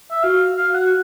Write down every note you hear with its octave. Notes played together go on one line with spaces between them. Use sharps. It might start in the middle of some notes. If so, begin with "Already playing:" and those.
E5
F#4 F5
F5
F#5